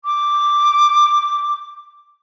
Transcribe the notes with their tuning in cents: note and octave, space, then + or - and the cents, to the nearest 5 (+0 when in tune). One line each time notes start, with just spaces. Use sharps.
D6 +0